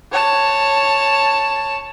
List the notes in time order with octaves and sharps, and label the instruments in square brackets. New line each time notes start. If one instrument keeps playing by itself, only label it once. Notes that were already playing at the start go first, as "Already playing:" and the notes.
[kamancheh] C#5 A5